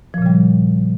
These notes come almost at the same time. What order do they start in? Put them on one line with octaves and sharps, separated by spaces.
F3 A#2 C#3 G3